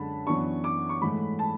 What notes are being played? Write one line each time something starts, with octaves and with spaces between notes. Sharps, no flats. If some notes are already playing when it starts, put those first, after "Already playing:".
Already playing: F#2 D3 G#3 A5 B5
F#2 E3 B3 D4 C#6
D6
C#6
G#2 E3 A3 B5
A5